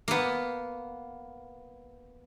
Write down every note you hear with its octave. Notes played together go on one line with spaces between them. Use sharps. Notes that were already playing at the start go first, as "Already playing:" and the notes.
A#3 B3